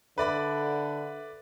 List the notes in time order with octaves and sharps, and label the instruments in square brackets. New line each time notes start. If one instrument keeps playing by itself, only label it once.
[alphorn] D3 [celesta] A4 E5 [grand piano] B4 D5 B5